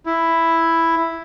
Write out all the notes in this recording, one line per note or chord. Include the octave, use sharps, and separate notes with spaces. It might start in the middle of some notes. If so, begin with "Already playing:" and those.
E4